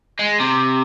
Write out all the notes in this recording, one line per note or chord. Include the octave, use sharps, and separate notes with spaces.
G#3
C3